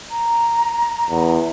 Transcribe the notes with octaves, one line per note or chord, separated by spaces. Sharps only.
A#5
E2